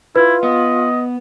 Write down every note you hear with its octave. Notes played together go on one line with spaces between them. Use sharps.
E4 F4 B4
B3 D#5